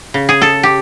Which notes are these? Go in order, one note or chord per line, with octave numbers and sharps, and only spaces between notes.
C#3
G#4
A4
G4